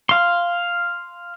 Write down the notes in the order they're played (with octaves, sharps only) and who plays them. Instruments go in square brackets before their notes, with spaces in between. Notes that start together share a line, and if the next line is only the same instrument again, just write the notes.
[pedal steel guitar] F5 C6